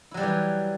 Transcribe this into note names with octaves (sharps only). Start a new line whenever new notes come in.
E3 F#3 G3 E4 G4